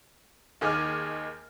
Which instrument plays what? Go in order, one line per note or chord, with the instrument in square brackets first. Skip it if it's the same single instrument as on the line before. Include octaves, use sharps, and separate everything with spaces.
[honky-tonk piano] D#2 D#3 G#4 G#5 D6 F6